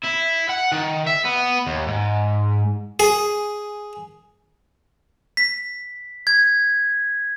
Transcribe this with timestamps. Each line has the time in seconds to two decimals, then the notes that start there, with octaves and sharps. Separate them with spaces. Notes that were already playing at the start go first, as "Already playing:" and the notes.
0.04 E4
0.50 F#5
0.72 D#3
1.06 E5
1.25 B3
1.67 D#2
1.88 G#2
3.00 G#4
5.37 B6
6.27 G#6